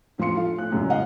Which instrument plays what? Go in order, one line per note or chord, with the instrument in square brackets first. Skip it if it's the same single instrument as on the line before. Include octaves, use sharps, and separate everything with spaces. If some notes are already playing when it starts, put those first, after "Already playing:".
[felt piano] A2 F3 F4 C6 C#7
F4 A4 F5
A2 F#6
E1 C#2 F#2 A2
D#5 F5 F#5